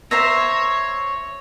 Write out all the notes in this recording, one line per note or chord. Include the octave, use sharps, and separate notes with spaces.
C5 C#5 E5 A#5 E6 A#6